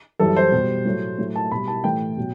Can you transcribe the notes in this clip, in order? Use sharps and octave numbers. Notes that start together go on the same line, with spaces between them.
F#2 E3 G3 A4
C5
B2 G3
A2 F#3 A3
A2 F#3 A3
A5
B2 G3 B5
A5
A2 E3 A3 G5
B2 F#3